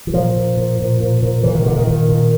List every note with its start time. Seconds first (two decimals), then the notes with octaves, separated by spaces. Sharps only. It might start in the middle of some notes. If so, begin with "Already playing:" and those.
0.07 E3
0.14 A#2 F3
0.36 A#2
0.57 A#2
0.79 A#2
1.00 A#2
1.22 A#2
1.43 A#2 E3
1.55 D#3
1.66 A#2 D3
1.76 D#3
1.87 A#2 D#3
2.09 A#2